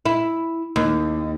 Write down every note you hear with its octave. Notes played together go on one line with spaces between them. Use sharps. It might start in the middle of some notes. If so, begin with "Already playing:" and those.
E4
D#2